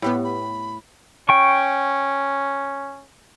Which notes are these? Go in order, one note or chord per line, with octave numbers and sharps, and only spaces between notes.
A2 B3 G4 F#5 B5
B5
C#4 G5 C#6